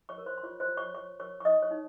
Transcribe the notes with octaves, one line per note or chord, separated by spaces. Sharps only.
C#5 C#6
A#4
C5 C6
C6
F4 C#5 C#6
C5 C6
F4
C#5 C#6
C#5 C#6
A#4 C#5 C#6
C#6
D#4 D#5 D#6
C#5 C#6
D#4